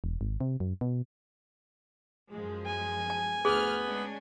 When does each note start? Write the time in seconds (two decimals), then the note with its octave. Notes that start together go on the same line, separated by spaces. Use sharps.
0.04 E1
0.21 G#1
0.41 C3
0.60 F#2
0.81 B2
2.31 F#2 F3 G#3
2.66 G#5
3.10 A5
3.45 D2 B3 G#4 F6
3.84 G#3 C#4 D4